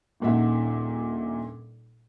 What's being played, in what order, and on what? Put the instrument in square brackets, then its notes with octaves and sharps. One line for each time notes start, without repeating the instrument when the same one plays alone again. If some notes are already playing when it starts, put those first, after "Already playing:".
[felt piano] D#1 A#1 A#2 D#4 E5 F#5